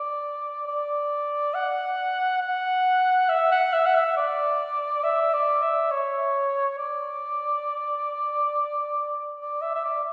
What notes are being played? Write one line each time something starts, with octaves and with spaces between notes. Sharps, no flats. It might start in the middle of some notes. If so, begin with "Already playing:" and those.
Already playing: D5
D5
F#5
F#5
E5
F#5
E5
F#5
E5
D5
E5
D5
E5
C#5
D5
D5
E5
E5
D5